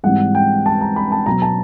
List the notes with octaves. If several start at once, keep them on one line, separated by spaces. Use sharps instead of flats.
G#2 E3 G3 C4 F#5
G5
A5
A#5
B5
A5
B2 F#3 B3 A#5
A5